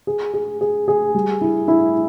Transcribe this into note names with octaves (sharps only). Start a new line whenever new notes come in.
G#4
G#4
G#4
G#4
G3
E4
E4